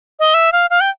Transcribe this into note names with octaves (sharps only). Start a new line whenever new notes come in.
D#5
E5
F5
F5
G5